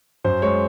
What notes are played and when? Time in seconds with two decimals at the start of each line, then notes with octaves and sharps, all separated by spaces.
0.24 F#2 C5
0.42 G#3 C#5